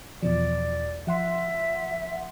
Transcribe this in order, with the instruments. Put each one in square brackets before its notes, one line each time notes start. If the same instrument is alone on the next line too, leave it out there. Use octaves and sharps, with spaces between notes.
[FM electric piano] E2 B2 F3 [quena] D5
[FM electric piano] F3 F#5 C6 [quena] E5